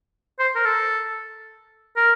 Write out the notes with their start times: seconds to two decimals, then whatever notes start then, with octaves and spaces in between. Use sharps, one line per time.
0.39 C5
0.56 A#4
0.65 A4
1.96 A#4